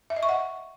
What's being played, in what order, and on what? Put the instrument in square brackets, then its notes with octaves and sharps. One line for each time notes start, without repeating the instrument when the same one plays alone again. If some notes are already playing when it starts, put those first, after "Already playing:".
[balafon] E5
D#5
C#6
F#5